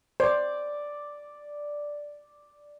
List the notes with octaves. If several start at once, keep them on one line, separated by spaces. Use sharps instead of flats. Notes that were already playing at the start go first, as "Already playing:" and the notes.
C5 D5